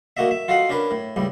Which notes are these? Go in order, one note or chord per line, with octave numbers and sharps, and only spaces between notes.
A3 A#3 F#4 D#5 E5
E5
F4 F#4 A4 D#5 F5 F#5
C#4 D4 A#4 B4
A2
C#2 A2 G3